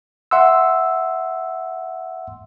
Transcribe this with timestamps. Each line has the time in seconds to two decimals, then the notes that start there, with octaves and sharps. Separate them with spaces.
0.31 E5 F#5 C6 E6